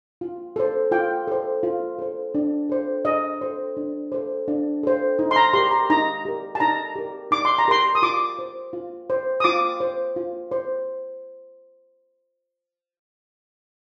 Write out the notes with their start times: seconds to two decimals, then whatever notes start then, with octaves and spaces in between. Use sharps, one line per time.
0.21 F4
0.56 A4 C5
0.92 F4 G5
1.27 A4 C5
1.63 F4
1.99 A4 C5
2.35 D4
2.69 A4 C5
3.05 D4 D#5
3.41 A4 C5
3.77 D4
4.12 A4 C5
4.48 D4
4.83 A4 C5
5.19 D#4
5.31 C6
5.36 A#5
5.53 G4 A#4 C6
5.71 A#5
5.90 D#4 A#5
6.25 G4 A#4
6.55 A5
6.60 D#4 A#5
6.96 G4 A#4
7.31 D#4 D6
7.45 C6
7.58 A#5
7.68 G4 A#4 C6
7.95 D#6
8.02 F4 D6
8.39 C5
8.73 F4
9.10 C5
9.40 D#6
9.44 F4 D6
9.80 C5
10.16 F4
10.52 C5